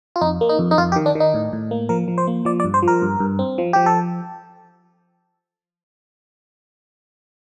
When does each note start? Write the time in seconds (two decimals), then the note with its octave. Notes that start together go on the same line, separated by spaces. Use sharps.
0.16 F4
0.21 F2 D#4
0.41 A#3
0.49 D#4
0.59 F2
0.71 D#4
0.78 F2 F4
0.92 G4
0.96 D#3
1.06 D4
1.15 D#3
1.20 D#4
1.34 A2
1.53 A2
1.71 A#3
1.89 F3 A#4
2.08 F3
2.18 C5
2.27 A#3
2.45 F3 D5
2.60 D5
2.64 G2
2.74 C5
2.83 F3
2.88 A#4
3.02 G2
3.20 G2
3.39 C4
3.58 F3
3.73 F3 G4
3.86 A4